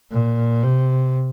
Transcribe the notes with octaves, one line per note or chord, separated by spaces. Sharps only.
A#2
C3